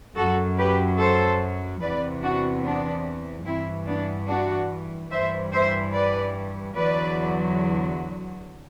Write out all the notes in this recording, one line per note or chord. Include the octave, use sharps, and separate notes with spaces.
F#2 F#3 F#4 A4
G4 B4
A4 C5
E2 C3 E3 B4 D5
D4 F#4
B3 D4
G2 E3 C4 E4
B3 D4
D4 F#4
G2 E3 C5 E5
C5 E5
B4 D5
E2 D3 F#3 B4 D5